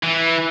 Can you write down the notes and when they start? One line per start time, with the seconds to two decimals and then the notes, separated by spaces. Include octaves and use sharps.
0.03 E3